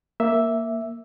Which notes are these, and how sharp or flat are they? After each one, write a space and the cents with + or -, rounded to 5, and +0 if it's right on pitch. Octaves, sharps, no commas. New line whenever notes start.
A#3 +0 E5 +0